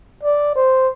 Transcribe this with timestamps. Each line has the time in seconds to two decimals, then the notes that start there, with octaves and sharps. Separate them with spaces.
0.23 D5
0.56 C5